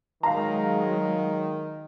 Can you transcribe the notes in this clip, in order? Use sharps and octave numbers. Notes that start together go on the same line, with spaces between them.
D#3 F#3 G#3 F5 A#5